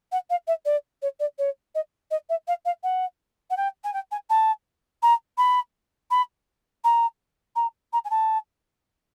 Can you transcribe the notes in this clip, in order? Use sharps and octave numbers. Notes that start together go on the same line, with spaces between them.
F#5
F5
E5
D5
C#5
D5
C#5
D#5
D#5
E5
F5
F5
F#5
F#5
G5
G#5
G5
G#5
A5
A#5
B5
B5
A#5
A#5
A#5
G#5
A5